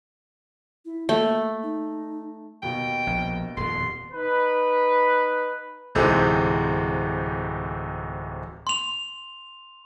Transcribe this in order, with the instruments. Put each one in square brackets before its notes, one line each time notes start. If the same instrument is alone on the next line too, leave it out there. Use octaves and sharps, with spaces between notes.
[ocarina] E4
[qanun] A3 [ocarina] A#3
[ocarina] D#4
[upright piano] D#2 B2 [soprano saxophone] G5
[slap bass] A#1
[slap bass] D#1 F2 [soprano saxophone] C6
[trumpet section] D#4 B4
[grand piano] D1 C3 E3 G#3 D#4 C5
[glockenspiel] C6 F7